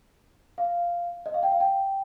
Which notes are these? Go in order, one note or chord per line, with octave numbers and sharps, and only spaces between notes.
F5
D#5
F5
G5
F5
G5